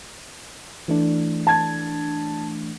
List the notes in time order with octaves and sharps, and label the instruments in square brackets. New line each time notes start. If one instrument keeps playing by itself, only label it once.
[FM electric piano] E3 A3 D4
[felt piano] A5 G#6